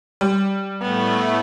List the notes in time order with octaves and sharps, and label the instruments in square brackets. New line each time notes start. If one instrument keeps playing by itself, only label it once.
[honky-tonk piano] G3
[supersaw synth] A2 A3 [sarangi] B3